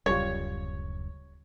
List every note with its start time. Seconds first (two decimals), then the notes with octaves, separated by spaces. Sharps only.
0.06 D1 F#2 C#3 G3 F4 C#5